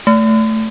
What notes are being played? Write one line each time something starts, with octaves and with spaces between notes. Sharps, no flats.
A3